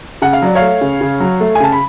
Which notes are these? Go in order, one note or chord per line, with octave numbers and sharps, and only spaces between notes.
C#3 F#5
F5
F#3 D5
C#5 F5
A3
C#3
C#3
F#3
A3
G#5
C#3 A5
B5